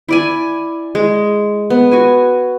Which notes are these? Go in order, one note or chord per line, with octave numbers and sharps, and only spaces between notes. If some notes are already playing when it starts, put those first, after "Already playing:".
E4 D5 G#5
G#3
B3
F#4 G#5